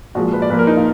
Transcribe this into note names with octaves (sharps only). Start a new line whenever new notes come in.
A#2 F3 G#3 F#4
B4
D5
A#2 F3 A#3 B4
A#4
D#4
F4